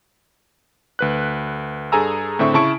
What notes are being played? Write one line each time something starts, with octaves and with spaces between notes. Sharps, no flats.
D2 B4 F#6
G2 G#4 A4 G#5 A#5 E6
A2 D3 C4 E5 C#6
C#3 E4 A5 C#6 D7